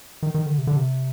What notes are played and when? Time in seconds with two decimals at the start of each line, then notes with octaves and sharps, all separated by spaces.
0.23 D#3
0.34 D#3
0.46 D3
0.58 C3
0.67 D3
0.76 C3